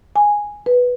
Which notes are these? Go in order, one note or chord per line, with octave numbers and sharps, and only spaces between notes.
G#5
B4